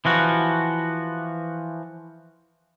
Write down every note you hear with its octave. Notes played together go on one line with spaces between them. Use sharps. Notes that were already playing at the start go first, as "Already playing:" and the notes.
E3 F3 F#4